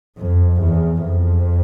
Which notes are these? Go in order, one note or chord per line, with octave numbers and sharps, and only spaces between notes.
F2
E2
F2